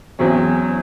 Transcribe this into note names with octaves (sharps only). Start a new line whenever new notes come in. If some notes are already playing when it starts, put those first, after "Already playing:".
E2 E3 F#3 C4 C#4